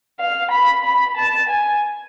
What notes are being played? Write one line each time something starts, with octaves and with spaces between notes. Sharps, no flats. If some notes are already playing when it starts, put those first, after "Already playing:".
F5
B5
B5
A5
G#5